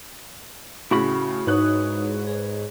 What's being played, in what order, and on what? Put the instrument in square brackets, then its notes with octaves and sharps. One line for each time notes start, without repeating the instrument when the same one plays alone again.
[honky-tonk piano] A2 C#3 [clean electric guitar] E4 F#4 B5
[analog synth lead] G#2 [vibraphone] D#4 D#6 [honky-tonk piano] B4 C#5 F#6
[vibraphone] G#4